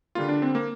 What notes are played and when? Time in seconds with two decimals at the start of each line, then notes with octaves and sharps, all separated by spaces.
0.15 D3 G3 A#3 F4
0.28 D4
0.42 C4
0.55 A#3